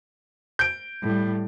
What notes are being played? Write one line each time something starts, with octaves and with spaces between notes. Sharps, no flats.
G6 D7
A2 G3